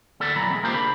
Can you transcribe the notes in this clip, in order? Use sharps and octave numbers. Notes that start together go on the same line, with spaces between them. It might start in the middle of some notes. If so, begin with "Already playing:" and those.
D2 B3 E4 A4 D5
B1 E3 F#3 A#5 B5
G#3 C4
A#3 F4 G4 B4 C5
C#3 D4 B5